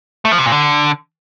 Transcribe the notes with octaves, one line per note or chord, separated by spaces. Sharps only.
A3
F3
C3
A#2
D3